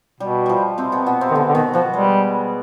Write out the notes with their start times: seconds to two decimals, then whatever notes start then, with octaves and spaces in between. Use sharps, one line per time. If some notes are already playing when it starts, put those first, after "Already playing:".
0.20 B2 G3
0.46 F3 G3
0.78 C3 C4
0.92 B2 B3
1.06 B2 B3
1.21 C3 C4
1.31 D#3
1.35 B2 D3 B3
1.49 D3
1.55 B2 D#3 B3
1.73 B2 F3 B3
1.93 G3 G#3